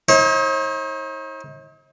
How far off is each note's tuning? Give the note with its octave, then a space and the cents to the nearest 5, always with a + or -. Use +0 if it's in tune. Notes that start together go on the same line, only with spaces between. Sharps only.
D#4 +40 C#5 -45